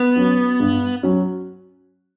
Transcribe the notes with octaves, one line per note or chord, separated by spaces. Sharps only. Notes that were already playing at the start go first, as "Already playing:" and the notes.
Already playing: B3
F#3 C#4 F#4
G2
F#3 C#4 F#4